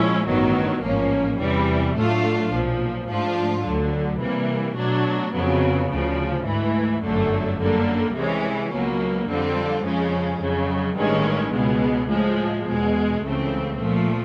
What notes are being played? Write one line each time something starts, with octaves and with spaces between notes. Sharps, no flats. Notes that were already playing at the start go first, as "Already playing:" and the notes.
Already playing: A#2 F3 G#3 C#4 E4
A1 G2 D#3 F#3 B3
A1 G#2 F3 A#3 C#4
E2 C3 E3 G3
A2 F#3 A3 D4 F4
B1 A#2 F3
G#2 F3 A3 D4 F4
D2 D3 F#3
C3 E3 G3 A#3
B2 F#3 A3 D4
F2 C#3 F#3 B3
D2 C#3 F3
G#2 E3 A3
G1 F#2 D3 F#3 A3
F#2 D3 G3 A#3
C2 C3 E3 G#3 C#4
C#2 B2 F#3 A#3
F2 D3 G3 C4 F4
F2 C#3 F3 G#3 C#4
F2 C#3 F#3
A1 G2 D#3 G#3 C#4
C#2 B2 G#3 B3
A2 F3 G#3
E2 B2 G#3
C#2 C#3 E3 A3 C4
A#2 F3 A3